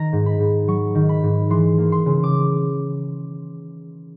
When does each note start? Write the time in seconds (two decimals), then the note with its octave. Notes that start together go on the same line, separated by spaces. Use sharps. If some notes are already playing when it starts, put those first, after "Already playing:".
Already playing: D#3 A#5
0.13 G#2
0.26 B5
0.40 G#2
0.68 F#3 C#6
0.95 D#3
1.09 B5
1.23 G#2
1.50 E3 C6
1.78 A#3
1.92 C6
2.06 C#3
2.24 D6